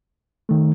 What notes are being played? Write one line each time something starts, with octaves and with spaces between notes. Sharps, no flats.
D#3 A3